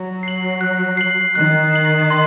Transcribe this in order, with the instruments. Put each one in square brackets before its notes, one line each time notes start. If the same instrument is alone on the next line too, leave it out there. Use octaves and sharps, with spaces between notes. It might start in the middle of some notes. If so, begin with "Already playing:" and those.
Already playing: [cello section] F#3
[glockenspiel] C7 F#7
F#6
C7 F#7
[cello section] D#3 [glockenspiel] F#6
[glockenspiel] C7 F#7
C6